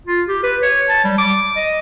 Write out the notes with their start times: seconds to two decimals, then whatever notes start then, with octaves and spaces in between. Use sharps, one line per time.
0.07 F4
0.28 G4
0.43 B4
0.63 C#5
0.89 A5
1.04 G3
1.18 D6
1.57 D#5